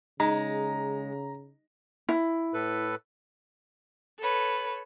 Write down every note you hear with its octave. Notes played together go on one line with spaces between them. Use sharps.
C#3 G#3 D#4 A#5
E4
A2 A4 B4
A4 B4 C#5